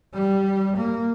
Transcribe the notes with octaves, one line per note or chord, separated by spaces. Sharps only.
G3
A#3